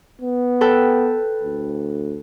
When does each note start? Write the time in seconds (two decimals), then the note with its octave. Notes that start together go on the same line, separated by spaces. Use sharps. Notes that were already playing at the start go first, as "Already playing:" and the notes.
0.21 B3
0.61 A4 B4 G5
1.43 D2